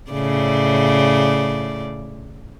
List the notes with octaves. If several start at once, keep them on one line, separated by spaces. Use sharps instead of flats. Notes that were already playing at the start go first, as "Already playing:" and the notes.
A2 C#3 D5